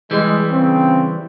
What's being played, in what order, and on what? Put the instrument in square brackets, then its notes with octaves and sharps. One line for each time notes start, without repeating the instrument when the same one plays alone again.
[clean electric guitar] E3 G3 [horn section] G#3
[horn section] C#3 C4